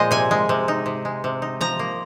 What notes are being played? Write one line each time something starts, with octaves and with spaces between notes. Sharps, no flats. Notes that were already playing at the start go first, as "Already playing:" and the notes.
Already playing: A#2 F3 G#3 C5 D#5
C3 G#5
G#3
C3
D#4
C3
G#3
C3
D#4
F3 A#5
A#3